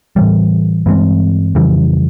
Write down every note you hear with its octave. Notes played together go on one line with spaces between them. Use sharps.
A2 E3 G3
G2 E3 G#3 C4
F2 C#3 E3 G3